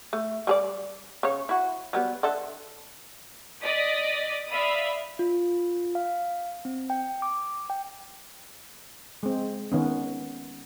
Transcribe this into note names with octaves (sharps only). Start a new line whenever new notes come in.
A3
G3 G#4 D5
C#3 C#5
E4 F#4
F#3 G3 B3
D3 A4 E5
D5 D#5 D#6 B6
D5 E5 F5 B5 D#6
F4
F5
C4
G5
D6
G5
G#3 C4
D#3 B3 C#4